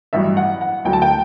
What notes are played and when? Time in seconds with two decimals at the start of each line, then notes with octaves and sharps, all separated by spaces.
0.13 A1 G2 F#3 E5
0.37 F#5
0.61 F#5
0.85 D2 D3 F#3 G5
0.93 A5
1.02 G5